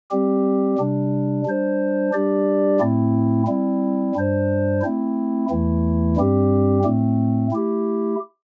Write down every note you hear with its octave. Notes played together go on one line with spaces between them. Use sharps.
G3 C4 G4
C3 G3 D4
G3 D4 C5
G3 D4 G4 D5
A2 A3 C4 E4
G3 C4 E4
G2 G3 D4 C5
A3 C4 E4
E2 E3 A3 E4
G2 G3 C4 G4
A2 A3 C4
A3 E4 G4